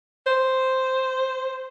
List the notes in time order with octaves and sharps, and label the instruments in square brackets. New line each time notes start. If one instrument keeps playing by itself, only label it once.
[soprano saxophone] C5